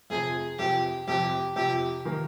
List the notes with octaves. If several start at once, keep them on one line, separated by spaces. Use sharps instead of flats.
F2 C3 F3 G#4
F2 C3 F3 G4
F2 C3 F3 G4
F2 C3 F3 G4
D#3 A#3